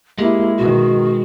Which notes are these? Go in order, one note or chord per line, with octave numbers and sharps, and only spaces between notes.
G#3 A#3 E4 G4
B2 D#3 F#4